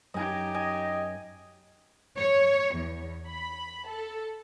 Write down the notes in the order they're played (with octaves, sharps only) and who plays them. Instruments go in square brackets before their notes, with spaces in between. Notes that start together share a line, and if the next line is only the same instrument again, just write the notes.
[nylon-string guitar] F#2 [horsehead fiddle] D#4 G4 [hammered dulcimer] D#5 G#5
[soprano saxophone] D#5 [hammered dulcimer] G#5
[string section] C#5
E2
B5
A4